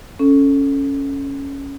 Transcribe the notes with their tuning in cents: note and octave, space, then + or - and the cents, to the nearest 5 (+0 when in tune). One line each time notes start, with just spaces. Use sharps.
C#4 +0 A4 +0